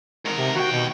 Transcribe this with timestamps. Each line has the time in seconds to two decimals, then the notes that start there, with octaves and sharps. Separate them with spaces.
0.25 G#2 A#4
0.37 C3
0.55 D#2 F#4 G5
0.72 B2